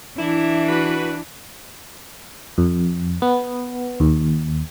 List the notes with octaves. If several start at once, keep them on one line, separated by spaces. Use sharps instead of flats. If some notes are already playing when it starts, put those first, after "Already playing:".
E3 D4 E4
F#4 B4
F2
B3
D#2